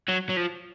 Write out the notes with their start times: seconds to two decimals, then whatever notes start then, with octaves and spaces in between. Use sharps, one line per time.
0.08 F#3
0.29 F#3
0.36 F3